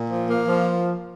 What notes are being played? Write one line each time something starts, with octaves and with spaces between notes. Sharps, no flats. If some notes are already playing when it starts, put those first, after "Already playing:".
Already playing: A#2
F3
A#3
F3